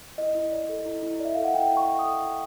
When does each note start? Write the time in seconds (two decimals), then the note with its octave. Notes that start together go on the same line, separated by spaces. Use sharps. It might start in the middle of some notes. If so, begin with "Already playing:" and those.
0.18 E4 D#5
0.35 E4
0.52 D5
0.69 A4
0.86 E4
1.03 E4
1.20 D5
1.25 E5
1.35 A4 F5
1.44 F#5
1.54 E4 G5
1.72 E4
1.77 C#6
1.88 D5
1.99 D#6
2.05 A4
2.22 E4